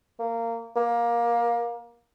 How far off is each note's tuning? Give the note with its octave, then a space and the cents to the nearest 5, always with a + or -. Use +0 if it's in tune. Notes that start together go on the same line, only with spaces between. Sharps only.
A#3 -20
A#3 +20